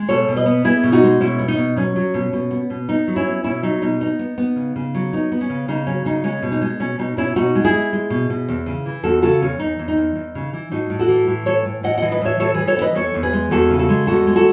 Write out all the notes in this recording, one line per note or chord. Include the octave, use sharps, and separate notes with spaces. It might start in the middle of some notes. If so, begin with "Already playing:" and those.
Already playing: G#3
B2 A4 C#5
B2
B4 D#5
B3
B3 E4 G#4
B2
D#4 F#4
G#3
B2 C#4 E4
B3
D#4
B2
F#3 C#4
F#3
B2
B2
B3
B2
B3 D#4
F#3
C#4 E4
B3
B2 C#4 E4
F#3 D#4
B2 D#4
B3 D#4
B3
B3
C#3
C#3
F#3
B3 D#4
B3
C#4
C#3
C#3 D#4
F#3 C#4
C#3 D#4
G#3 C#4
B2
D#4
G#3
B2 C#4
B2 D#4
B2 C#4 E4
B2 D#4 F#4
G#3
E4 G#4
G#3
G#3
B2
B2
E2
C#3
E3
E2 F#4 A4
C#3 F#4 A4
E2 C#4
E2 D#4
E2
D#4
E2
E2
C#3
E3
A2 D#4 F#4
A2
F#4 A4
E3
A2
E3 A4 C#5
A2
A2 D#5 F#5
E3 D#5 F#5
B4 D#5
A2 C#5 E5
E3 A4 C#5
E3 G#4 B4
A4 C#5
B3
B4 D#5
E2 A4 C#5
E2
G#4 B4
G#3
E2 F#4 A4
C#3
F#4 A4
G#3
E2 F#4 A4
G#3
F#4 A4